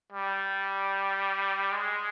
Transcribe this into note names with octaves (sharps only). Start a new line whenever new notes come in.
G3
G#3